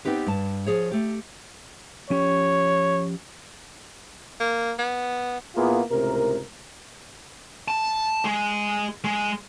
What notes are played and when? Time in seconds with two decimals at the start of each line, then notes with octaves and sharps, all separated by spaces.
0.05 B3 C4 D#4 G4 B4
0.27 G2 A5
0.66 F3 G#4 C#5
0.92 A3 G4
2.10 F3 C#4 G4 C#5
4.40 A#3
4.79 B3
5.56 A#2 A#3 B3 E4 F4 G#4
5.91 C#2 A2 C3 A#4
7.68 A5
8.25 G#3
9.04 G#3